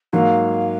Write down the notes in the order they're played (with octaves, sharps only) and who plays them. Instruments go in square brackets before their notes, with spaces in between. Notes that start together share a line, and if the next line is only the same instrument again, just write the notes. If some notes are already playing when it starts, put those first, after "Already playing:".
[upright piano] G#2 F#3 A#3 [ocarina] F5